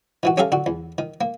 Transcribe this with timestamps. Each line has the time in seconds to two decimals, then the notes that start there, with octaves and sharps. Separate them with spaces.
0.23 D#3 E3 F#4
0.37 C#4 G4 A4 E5 F5 A#5
0.52 D3 F#4
0.66 E2
0.98 D#3
1.21 A#3